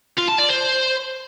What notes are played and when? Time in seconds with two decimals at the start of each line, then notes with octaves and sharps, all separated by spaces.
0.18 F4
0.28 A5
0.38 D5
0.49 C5